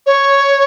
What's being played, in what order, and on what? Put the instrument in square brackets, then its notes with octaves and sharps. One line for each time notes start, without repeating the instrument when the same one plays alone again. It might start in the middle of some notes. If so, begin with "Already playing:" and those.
[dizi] C#5